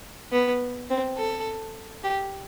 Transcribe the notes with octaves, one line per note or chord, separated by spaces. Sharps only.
B3
C4
A4
G4